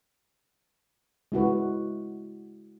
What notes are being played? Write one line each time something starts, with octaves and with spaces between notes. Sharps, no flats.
G#3 E4 F#4 B4